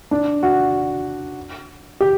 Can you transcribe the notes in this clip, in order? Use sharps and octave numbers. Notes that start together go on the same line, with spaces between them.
D4
F#4
G4